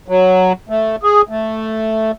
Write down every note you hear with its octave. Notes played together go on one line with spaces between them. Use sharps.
F#3
A3
G#4
A3